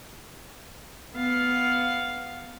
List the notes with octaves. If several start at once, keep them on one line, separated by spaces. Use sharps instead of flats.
B3 F5